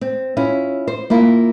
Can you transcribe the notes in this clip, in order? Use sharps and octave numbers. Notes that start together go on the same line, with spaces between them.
C4
C#4 E4 F4
C5
A#3 E4 F4